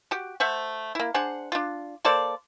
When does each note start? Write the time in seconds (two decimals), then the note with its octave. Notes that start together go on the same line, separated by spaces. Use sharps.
0.11 F#4 G4
0.40 A3 C5 E5 F#5
0.95 A#3 E4
1.14 D4 G#4 C5 F#5
1.52 D4 F4
2.05 A#3 A4 C5 D5